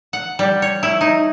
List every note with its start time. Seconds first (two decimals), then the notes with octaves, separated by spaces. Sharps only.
0.13 F#5
0.39 G3
0.62 C#5
0.83 E4
1.01 D#4